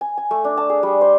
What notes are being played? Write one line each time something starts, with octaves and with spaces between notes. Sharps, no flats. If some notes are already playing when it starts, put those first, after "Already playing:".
G#5
G#5
A3
D4
A5
G#4
G3
C5